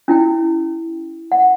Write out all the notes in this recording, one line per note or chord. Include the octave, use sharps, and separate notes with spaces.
C#4 E4 G5
F#5